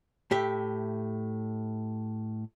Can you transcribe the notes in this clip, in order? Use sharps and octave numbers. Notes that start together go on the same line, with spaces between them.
A2 G4 E5